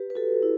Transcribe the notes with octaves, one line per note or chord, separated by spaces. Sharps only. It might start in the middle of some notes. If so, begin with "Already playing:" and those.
Already playing: G4 B4
B4
F#4 A4
E4